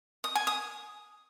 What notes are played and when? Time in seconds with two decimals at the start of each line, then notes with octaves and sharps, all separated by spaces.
0.24 D#6
0.35 G#5
0.47 D#6